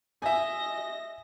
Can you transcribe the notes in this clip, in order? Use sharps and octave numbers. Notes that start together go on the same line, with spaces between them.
D#5 E5 G#5 A#6